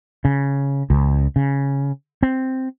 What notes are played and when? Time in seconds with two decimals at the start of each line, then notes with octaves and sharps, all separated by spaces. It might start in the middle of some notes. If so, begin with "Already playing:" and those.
0.25 C#3
0.90 C#2
1.36 C#3
2.23 C4